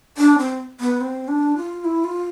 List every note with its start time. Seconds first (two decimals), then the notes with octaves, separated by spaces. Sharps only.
0.18 D4
0.38 C4
0.80 B3
1.01 C4
1.28 D4
1.57 F4
1.85 E4
2.04 F4